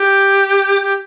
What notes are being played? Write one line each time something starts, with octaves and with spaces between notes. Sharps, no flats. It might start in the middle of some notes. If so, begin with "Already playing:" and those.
Already playing: G4
G4